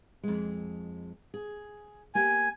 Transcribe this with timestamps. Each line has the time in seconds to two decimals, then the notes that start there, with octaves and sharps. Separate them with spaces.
0.23 F2 G#3
1.34 G#4
2.15 A#3 G4 G#5